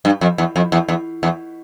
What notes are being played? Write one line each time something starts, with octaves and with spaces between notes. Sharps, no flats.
G2
F2
E2
F2
E2
E2
E2